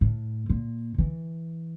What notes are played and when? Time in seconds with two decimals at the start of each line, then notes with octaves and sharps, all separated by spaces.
0.01 A2
0.49 A#2
0.98 E3